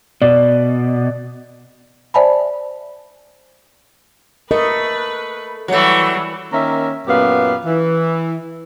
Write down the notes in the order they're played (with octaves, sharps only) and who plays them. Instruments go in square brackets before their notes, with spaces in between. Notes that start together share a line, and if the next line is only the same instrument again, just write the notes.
[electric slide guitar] B2 [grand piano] D5
[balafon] C5 D5 E5 G#5 A5 B5
[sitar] A3 [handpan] A#4 D#5 [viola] B4
[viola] E3 G3 [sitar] F#3 A3
[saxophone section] D#3 A#3 C#4 A#4 E5
F#2 A#2 B3 G4 B4 F5
E3